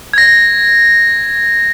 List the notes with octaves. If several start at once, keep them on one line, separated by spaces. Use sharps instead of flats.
G#6 A#6